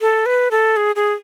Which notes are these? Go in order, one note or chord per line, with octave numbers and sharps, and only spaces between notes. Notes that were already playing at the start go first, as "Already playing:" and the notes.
A4
B4
A4
G#4
G#4